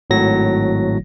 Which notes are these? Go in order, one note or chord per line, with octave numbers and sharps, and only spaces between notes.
G#1 A2 F#3 A#6